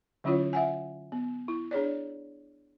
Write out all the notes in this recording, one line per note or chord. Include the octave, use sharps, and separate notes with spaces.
D3 F#3 C#4 E4 F4 C#5
E5 F#5 G#5
B3
E4
D4 G#4 C#5 D5